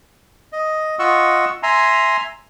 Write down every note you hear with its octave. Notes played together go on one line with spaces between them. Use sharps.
D#5
F4 D#5 F#5 C#6 E6
E5 G#5 A#5 C6